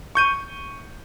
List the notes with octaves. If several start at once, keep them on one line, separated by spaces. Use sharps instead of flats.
C#6 G6 D#7